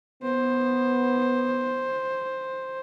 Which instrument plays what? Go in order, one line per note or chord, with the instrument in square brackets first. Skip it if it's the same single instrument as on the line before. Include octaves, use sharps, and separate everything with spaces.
[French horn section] B3 [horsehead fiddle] C5